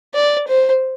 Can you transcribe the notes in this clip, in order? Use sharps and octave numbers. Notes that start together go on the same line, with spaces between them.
D5
C5